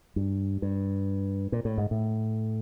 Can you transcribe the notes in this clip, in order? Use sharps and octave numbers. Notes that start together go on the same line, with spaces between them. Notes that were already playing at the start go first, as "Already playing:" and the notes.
G2
G2
A#2
A2
G#2
A2